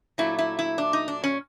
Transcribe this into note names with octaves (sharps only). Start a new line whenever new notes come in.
A#2 F#3 A3 E4
E4
E4
D4
D#4
D4
C#4